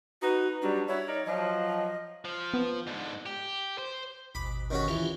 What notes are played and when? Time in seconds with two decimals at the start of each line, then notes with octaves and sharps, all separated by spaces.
0.22 D#4 F#4 B4
0.62 F#3 G3 D4
0.88 E4 F#4 C#5
1.07 D#4 A#4 D5
1.26 F3 F#3 D#5
2.25 F3
2.54 B3
2.87 G#2 D3
3.26 G4
3.78 C5
4.35 G#1 D#2 B2 B5 D6
4.70 D#3 C#4 F#4
4.88 E3 C#4 F4 G4